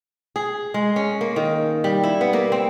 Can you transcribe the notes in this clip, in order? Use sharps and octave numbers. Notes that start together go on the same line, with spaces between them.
G#4
G#3
C#4
A#3
D#3
G3
E4
B3
A#3
C4